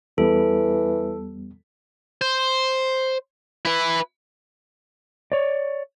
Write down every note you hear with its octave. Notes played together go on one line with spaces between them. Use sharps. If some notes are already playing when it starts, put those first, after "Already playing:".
E2 E3 G3 B3 A4
C5
E4 B4
C#5 D5